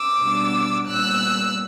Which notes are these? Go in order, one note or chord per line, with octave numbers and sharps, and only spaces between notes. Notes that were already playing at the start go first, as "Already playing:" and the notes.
Already playing: D6 E6
B2 G3 B3 D4
A#2 G3 B3 E6 F#6